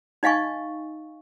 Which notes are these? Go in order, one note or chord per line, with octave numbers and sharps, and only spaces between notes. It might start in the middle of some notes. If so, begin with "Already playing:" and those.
D#4 D#5 F5 G#5 C#6